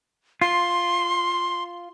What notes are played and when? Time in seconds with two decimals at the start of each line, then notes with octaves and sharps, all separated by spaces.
0.41 F4 C6